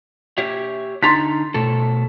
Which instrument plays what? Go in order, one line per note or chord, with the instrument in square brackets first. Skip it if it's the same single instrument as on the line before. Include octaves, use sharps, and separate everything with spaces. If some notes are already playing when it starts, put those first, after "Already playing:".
[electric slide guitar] G4 C#5 E5
[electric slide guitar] D3 D#4 A#5 [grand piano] C6 A6 B6
[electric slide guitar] B2 A3 A4